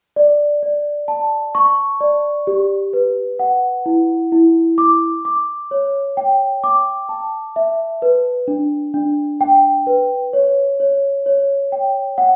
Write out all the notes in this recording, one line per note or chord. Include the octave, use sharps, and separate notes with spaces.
D5
D5
A5
C#6
D5
G4
B4
F#5
E4
E4
D6
D6
C#5
G5
D6
A5
E5
B4
D4
D4
G5
B4
C#5
C#5
C#5
G5
F#5